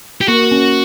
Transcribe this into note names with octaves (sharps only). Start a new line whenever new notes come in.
G4
A#3 F#4
C#4